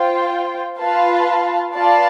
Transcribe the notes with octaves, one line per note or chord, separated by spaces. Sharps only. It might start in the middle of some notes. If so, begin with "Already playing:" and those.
Already playing: F4 C5 G5
F4 B4 F5 A5
F4 B4 D5 F5 A5